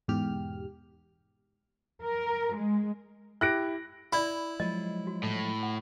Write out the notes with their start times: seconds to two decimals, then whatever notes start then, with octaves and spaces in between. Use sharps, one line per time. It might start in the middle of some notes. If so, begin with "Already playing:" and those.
0.08 E2 G#2 B2 G4 F6
2.03 A#4
2.56 G#3
3.41 E4 G4 F#6 A#6 D7
4.13 E4 D5 B5
4.60 F3 F#3 G#3 D#5
5.07 F#4
5.24 A2
5.63 F#5